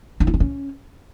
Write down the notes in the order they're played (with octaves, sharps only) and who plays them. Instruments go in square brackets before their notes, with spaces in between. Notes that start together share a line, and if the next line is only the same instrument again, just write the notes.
[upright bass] D#4
E4
C4
C#4